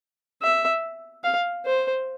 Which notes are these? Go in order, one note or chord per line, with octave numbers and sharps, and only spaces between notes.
E5
F5
C5